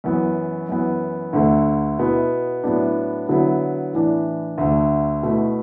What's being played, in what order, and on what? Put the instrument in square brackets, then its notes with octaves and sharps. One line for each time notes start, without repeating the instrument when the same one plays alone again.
[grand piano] F#2 E3 B3
F#2 E3 B3
D2 D3 A3
B2 B3 E4
A2 F#3 B3 D4
D3 F#3 B3 E4
A2 E3 D4
D2 D3 A3
B2 A3 E4